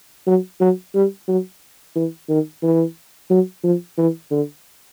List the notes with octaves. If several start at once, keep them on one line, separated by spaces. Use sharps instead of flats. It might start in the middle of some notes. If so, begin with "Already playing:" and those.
F#3
F#3
G3
F#3
E3
D#3
E3
F#3
F3
E3
D3